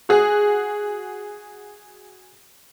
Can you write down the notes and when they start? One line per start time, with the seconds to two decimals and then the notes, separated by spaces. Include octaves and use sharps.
0.09 F#4 G#4